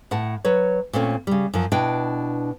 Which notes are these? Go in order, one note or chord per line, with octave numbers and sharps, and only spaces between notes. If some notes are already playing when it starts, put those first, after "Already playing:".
A2 F#5 A5
F#3 B4 C#5
A#2 A3 C4 C#4
C#3 G3
F#2 F3
B2 D4 E4 G5